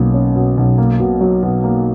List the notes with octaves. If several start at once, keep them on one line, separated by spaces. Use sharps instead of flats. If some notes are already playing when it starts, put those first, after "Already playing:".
Already playing: B1 B2 A#3 C#4
C#4
B2
B1
A#3
B2
F#3
B2
A#3